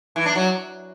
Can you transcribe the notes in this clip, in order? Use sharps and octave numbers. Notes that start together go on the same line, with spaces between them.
E3
D4
F#3